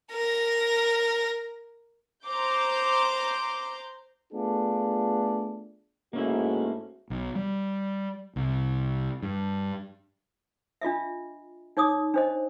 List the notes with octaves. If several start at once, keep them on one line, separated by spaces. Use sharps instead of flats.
A#4 A#6
C5 A#5 C6 D6 G6
A3 B3 D4 F4 G#4
G#2 A3 A#3 C#4 E4 F#4
B1
G3
C2
G2
D4 F4 D#5 E5
D#4 C#5 D5 D6 D#6
D4 C5 D#5